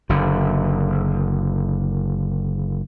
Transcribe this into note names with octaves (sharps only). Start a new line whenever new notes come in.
F#1 D3